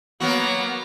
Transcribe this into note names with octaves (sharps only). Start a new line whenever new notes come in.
F#3 A#3 B3 F#4